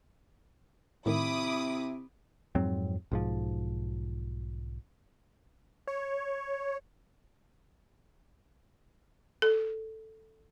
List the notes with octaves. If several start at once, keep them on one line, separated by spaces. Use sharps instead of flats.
A2 C3 D#3 E4 B5 D6 D#6
F2 G#2 F#3 C4
B1 G#2 F3
C#5
A4